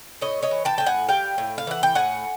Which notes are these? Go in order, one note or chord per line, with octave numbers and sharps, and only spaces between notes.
A2 C#5 D#5
C#5 D#5
E3
G5 A5
A2 G5
F#5 G#5
G3 F5 G5
A2
F5
E3 F#5
G5
A2 F#5 G#5